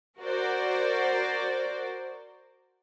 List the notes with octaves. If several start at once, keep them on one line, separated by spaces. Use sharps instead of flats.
F#4 A#4 C5 D5